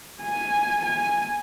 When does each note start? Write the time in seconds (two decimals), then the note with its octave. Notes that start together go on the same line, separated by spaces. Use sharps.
0.22 G#5
0.85 G#5